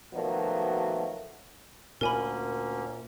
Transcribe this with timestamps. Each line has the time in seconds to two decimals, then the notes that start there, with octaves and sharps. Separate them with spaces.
0.14 B2 D#3 F3 F#3 A3 A#3
2.01 D2 A#2 A#3 C#4 A#4 G#5 B5